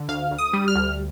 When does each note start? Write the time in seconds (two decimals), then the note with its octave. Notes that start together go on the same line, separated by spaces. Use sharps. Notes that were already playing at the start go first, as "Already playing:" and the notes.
Already playing: D3
0.09 D2 F5
0.31 D2
0.38 D#6
0.53 G3
0.68 F6
0.75 D2